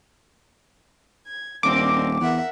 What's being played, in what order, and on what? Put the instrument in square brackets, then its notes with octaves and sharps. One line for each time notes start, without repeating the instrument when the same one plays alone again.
[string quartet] G#6
[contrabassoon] D#1 [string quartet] C4 D4 A#4 [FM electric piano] D6
[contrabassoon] E2 [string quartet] A#4 E5 F#5